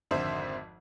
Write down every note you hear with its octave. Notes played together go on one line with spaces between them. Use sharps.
G#1 F2 D3 C5 E5